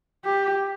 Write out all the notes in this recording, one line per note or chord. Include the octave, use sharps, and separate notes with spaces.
G4